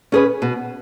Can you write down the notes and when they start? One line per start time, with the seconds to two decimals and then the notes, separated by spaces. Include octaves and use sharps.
0.12 C#4 G#4 B4
0.42 B2